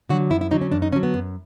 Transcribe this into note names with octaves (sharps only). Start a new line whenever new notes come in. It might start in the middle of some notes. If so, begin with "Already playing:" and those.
D3 F#3 F#4
F#2 E4
E4
D3 F#3 D#4
C#4
F#2 D4
D#4
D3 F#3 C#4
B3
F#2